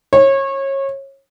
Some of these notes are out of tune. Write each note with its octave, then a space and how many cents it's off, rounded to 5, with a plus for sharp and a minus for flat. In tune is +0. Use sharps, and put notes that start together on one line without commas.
C#5 -25